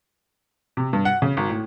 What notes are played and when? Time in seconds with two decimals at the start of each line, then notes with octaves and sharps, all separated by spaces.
0.77 C3
0.93 G2
1.05 F#5
1.22 C#3
1.37 G#1
1.50 A2